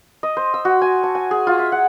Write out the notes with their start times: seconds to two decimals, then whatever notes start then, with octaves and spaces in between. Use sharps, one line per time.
0.23 D#5
0.37 C5
0.54 E6
0.65 F#4
0.82 G#5
1.03 A5
1.15 G#5
1.31 G#4
1.47 F4
1.59 E5
1.72 F#5